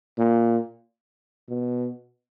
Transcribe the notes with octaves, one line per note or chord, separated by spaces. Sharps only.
A#2
B2